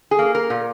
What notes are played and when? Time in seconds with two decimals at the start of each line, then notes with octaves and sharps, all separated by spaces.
0.11 G#4
0.19 A#3
0.35 A#4
0.50 A#2